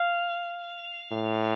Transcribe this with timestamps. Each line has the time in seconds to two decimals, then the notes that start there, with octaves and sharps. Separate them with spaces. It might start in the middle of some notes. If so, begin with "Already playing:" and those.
Already playing: F5
1.11 A2